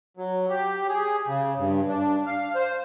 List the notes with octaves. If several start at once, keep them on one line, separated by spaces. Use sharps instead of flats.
F#3
G4
G#4
C#3
G2
D4
F5
C5